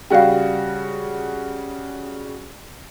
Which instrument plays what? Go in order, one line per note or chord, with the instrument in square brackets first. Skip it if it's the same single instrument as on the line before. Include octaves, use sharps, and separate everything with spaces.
[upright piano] C#3 G3 F#4 [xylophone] F5 G5